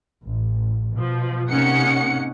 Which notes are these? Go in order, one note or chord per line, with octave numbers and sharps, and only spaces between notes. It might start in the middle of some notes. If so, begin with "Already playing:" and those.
A1
B2 F3
C3 A#3 C#4 D#4 F#5 C#7